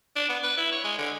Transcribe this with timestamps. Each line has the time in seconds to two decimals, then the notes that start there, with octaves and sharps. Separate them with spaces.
0.16 D4
0.29 B3
0.43 B4
0.57 E4
0.72 C#5
0.84 G#3
0.98 D3